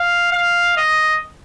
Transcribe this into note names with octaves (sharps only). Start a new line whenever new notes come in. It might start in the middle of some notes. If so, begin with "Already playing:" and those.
Already playing: F5
F5
D#5